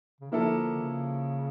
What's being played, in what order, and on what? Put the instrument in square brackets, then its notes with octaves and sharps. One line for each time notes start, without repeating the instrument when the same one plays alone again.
[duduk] C#3
[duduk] D3 [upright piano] F3 A#3 E4 A4
[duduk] C#3